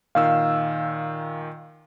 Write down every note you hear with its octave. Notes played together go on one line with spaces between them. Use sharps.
A#2 D#3 F5 E6